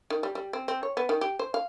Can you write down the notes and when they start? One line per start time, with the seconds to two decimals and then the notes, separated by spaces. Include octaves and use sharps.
0.10 D#3
0.23 G3
0.35 G3
0.53 C4
0.68 C4
0.83 C#5
0.97 B3
1.09 D#3
1.21 G4
1.39 C5
1.54 F5